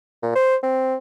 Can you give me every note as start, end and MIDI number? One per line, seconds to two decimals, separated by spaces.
0.23 0.35 46
0.36 0.56 72
0.63 0.96 60